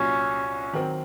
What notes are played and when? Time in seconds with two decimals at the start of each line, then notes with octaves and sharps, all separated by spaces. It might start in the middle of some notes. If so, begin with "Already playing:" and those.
Already playing: C2 A#2 F#3 C#4
0.73 D#3 F#3 C4